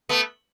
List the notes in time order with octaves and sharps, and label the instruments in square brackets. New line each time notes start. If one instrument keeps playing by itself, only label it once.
[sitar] A3 B3